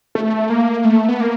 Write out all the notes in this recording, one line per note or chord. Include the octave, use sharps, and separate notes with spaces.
A3
A#3
A3
B3
A#3